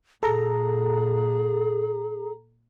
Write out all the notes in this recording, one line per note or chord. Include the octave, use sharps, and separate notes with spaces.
A#2 G#4 A4 A#5